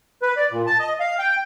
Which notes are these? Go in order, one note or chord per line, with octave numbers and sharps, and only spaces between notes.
B4
D5
A#2
A5
D#5
F5
G5